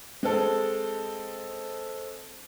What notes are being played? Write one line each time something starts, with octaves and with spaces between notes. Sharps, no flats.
G#3 C4 A4